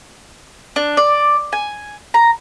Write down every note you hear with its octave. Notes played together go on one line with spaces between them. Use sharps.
D4
D5
G#5
A#5